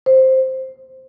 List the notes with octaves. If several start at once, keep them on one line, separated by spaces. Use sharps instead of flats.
C5